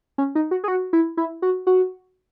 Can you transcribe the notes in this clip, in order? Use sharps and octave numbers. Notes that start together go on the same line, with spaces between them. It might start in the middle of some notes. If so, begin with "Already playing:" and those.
C#4
D#4
F#4
G#4
F#4
E4
E4
F#4
F#4